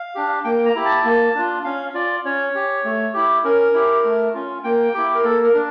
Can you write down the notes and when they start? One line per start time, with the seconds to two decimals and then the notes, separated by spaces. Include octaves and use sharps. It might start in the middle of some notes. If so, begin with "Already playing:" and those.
Already playing: F5
0.15 D4 G4
0.45 A#3 G5
0.66 A#5
0.75 E4 G4
0.85 A5
1.05 A#3
1.35 D4 F4
1.64 C#4 F5
1.94 F4 D5
2.25 C#4 C#5
2.55 G4
2.85 A3
3.14 E4 G4
3.44 C#4 A#4
3.74 E4 G4
4.04 A3
4.34 C#4 F4
4.64 A#3 G5
4.94 E4 G4
5.15 A#4
5.24 A#3 A4
5.44 A#4
5.54 D4